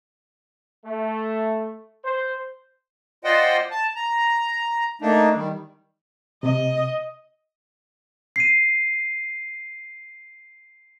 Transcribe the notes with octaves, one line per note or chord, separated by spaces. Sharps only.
A3
C5
F4 C5 D5 D#5 F#5 G5
A5
A#5
A3 A#3 D4 D#4
D#3 G3
C3 D#5
C7 D#7